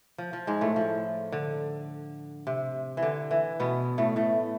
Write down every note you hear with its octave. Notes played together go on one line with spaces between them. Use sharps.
F3
F3
G#2 G#3
A2 A3
F3
D3
C3
E3
D3
E3
B2 B3
A2 A3
A2 A3